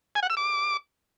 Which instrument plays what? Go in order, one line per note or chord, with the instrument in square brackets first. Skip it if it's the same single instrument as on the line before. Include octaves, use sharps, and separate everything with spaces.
[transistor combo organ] G#5
F#5
E6
D6